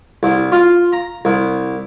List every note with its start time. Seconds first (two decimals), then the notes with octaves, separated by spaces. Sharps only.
0.23 C2
0.52 F4
0.92 A#5
1.25 C2